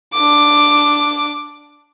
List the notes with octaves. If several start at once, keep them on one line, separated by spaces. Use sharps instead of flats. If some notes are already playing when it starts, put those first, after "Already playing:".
D4 D6